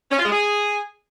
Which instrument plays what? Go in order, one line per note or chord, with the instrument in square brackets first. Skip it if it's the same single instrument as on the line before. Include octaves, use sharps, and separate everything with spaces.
[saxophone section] C#4
F4
G#3
G#4